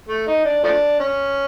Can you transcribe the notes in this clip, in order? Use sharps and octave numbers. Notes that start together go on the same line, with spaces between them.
A3
D#4
D4
F3 A3 D4
C#4